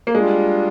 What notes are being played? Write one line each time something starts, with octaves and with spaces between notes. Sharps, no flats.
A#3
G3 G#3 D4 F4